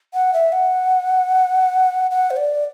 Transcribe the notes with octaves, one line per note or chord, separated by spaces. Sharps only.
F#5
E5
F#5
F#5
C5
D5